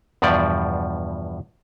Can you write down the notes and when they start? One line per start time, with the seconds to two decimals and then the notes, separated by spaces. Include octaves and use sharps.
0.22 E2 G2 B2 F3 D5